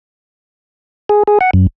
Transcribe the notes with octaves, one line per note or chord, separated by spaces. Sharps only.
G#4
G#4
F#5
F#2